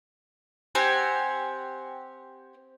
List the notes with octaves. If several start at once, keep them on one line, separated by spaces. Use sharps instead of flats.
C4 G4 F#5 G#5